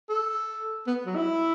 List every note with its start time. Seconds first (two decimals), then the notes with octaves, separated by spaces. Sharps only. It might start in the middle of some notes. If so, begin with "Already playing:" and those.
0.09 A4
0.87 B3
1.06 F#3
1.16 E4